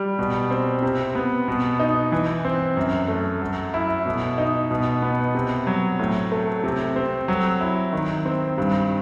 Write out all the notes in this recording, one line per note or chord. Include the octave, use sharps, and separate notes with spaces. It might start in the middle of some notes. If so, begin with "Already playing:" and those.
Already playing: G3
B2
C4
C3
B3
B2
D#4
E3
C4
F#2
A3
F#3
E4
B2
D#4
B2
B3
C3
F#3
A2
A3
C3
C4
F#3
E4
D#3
C4
G2